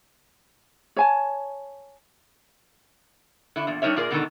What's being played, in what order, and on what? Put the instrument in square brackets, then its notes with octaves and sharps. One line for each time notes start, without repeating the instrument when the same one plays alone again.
[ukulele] C#5 G#5 A5
[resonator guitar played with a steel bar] D3 E4
E2 A#2
G3 D4 D#4 A#4 C#5 E5
A#2 F4 G#4 A#4 D5
G#2 B2 D3 D#3 A4 A#5